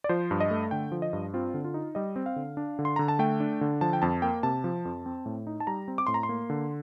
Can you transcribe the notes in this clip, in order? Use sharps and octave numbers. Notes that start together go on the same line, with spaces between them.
D5
F3 C5
G2
D#5
A3
D3 G5
F3
D#5
G2
C4 F4
D3
F4
D#4
G3 D#5
C4
F5
D3
D4
D3
C6
D3 A#5
A5
A3 G5
D4
D3
F3 A5
G5
F2 A5
A#3 G5
C3 A5
F3
F2
C4
A2
D#4
A5
G3 A#5
C4
D6
A2 C6
A#5
C6
A#3
D3